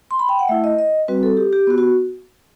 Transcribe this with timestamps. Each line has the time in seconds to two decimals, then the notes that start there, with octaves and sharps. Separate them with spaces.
0.11 C6
0.19 B5
0.29 G5
0.39 F#5
0.48 A3 E4 E5
0.64 D#5
0.79 D#5
1.08 G3 C4 F#4 B4
1.23 A4
1.37 G4
1.53 G4
1.67 B3 F#4
1.78 F#4